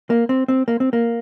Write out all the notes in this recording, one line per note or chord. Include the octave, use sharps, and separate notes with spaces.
A#3
C4
C4
A#3
C4
A#3